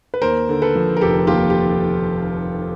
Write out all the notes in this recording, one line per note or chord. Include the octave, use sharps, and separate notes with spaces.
B4
D#2 A#4 C5
D3
A4 B4
F3
A#4
F1 G4 A4
D#2 F4 G4
G4